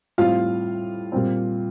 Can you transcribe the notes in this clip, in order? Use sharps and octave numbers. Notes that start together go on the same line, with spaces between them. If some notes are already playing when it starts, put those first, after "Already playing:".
A2 G3 C4 F4 F5
A#2 G3 C4